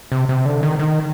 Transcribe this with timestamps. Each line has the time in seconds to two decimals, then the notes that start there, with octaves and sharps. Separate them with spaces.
0.12 C3
0.29 C3
0.46 D3
0.63 D#3
0.79 D#3